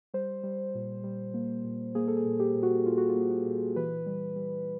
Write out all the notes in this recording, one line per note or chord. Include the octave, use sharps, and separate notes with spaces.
G3 C5
G3
A#2
G3
A#3
A#2
A#3 G#4
A4
G#4
A#2
G4
A#2
F#4
A#2 F4
F#4
F4
A#3
F#4
A#2
E3 B4
G3
G3